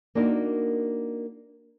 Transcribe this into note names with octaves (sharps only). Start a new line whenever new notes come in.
A#3 D4 D#4 F#4 A#4